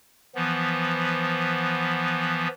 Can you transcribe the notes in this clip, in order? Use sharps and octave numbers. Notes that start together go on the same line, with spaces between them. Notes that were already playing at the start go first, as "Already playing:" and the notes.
E3 F3 B3